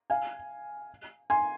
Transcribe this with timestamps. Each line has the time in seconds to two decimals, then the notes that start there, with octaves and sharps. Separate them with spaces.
0.10 F5 G#5
1.30 G#5 C6